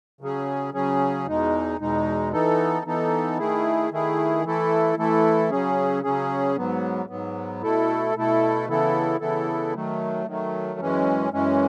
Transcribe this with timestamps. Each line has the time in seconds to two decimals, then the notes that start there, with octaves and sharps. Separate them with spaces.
0.21 C#3 F#3 C#4 G#4
0.74 C#3 F#3 C#4 G#4
1.27 E2 B2 G#3 D#4
1.80 E2 B2 G#3 D#4
2.32 E3 B3 D#4 A4
2.86 E3 B3 D#4 A4
3.39 D#3 A3 E4 G#4
3.91 D#3 A3 E4 G#4
4.44 E3 A3 E4 A4
4.97 E3 A3 E4 A4
5.50 C#3 F#3 C#4 G#4
6.03 C#3 F#3 C#4 G#4
6.56 G#2 F#3 B3
7.09 G#2 F#3 B3
7.62 B2 A3 E4 A4
8.16 B2 A3 E4 A4
8.68 C#3 E3 B3 E4 A4
9.21 C#3 E3 B3 E4 A4
9.74 D#3 F#3 A3
10.26 D#3 F#3 A3
10.80 F#2 E3 G#3 C#4
11.33 F#2 E3 G#3 C#4